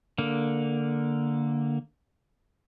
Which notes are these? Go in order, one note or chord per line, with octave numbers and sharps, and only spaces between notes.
D3 A#3